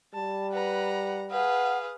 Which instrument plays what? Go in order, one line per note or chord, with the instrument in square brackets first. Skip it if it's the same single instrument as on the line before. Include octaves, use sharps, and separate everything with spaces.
[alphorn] G3 [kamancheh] A5
[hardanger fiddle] B4 [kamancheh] F#5 A#5
[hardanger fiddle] G#4 B4 [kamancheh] F5 D#6 [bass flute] F#5